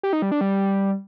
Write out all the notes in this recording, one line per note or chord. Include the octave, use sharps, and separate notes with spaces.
G4
D#4
G3
D4
G3